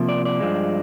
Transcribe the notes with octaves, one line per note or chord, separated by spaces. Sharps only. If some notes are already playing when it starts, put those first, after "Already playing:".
Already playing: C3 F3 A#3
D5
D5
G2 F3 G#3